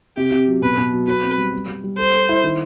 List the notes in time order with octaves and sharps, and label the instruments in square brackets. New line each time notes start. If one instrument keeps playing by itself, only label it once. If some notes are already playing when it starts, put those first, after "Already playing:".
[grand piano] C3 [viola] G4
[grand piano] C3
F#3
[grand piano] B2 [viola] B4
[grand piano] B2
F#3
[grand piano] F#4 [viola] B4
[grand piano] C4
G3
G3
G3
G3
[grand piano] A4 [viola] C5
[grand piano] A4
E4
D#3